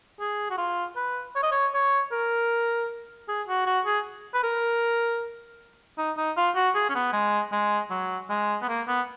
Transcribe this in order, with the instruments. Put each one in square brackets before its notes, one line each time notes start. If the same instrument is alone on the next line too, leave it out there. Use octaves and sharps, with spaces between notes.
[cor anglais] G#4
F#4
F4
B4
C#5
D#5
C#5
C#5
A#4
G#4
F#4
F#4
G#4
B4
A#4
D#4
D#4
F4
F#4
G#4
C#4
B3
G#3
G#3
F#3
G#3
B3
A#3
B3